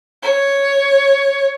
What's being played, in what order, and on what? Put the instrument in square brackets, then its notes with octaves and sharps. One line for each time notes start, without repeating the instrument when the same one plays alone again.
[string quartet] C#5